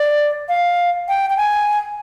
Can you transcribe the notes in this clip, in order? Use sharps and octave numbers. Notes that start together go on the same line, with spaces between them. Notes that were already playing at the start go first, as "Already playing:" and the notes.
Already playing: D5
F5
G5
G5
G#5